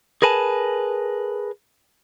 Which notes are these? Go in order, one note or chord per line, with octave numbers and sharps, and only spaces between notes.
G#4 A#4 B4 G#5 A5